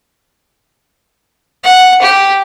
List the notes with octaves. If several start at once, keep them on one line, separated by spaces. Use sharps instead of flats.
F#5
G4